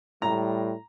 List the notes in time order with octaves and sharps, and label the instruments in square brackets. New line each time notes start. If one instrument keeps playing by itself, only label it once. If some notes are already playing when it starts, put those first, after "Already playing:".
[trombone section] A2 G3 [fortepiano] A#5